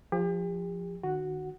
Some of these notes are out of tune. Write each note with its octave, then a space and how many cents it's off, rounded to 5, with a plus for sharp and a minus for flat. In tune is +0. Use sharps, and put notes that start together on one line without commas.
F3 +0 G4 +40
D#3 -40 F#4 +0 F#5 -5